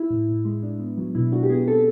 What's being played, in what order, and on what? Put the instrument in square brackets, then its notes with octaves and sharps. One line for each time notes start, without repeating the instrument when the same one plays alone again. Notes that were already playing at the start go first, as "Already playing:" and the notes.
Already playing: [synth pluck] E4
A2
A2
G#3
D4
B3
F#3
B2 E4
D4 F#4
G4
B3 G#4
C4 A4